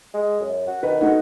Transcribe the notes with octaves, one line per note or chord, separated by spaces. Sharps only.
G#3
F#2
F#4
D#3 B4
A3 D#4 F#4